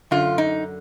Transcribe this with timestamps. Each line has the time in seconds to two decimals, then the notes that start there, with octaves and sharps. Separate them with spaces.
0.11 F#2 D3 F4
0.38 D#4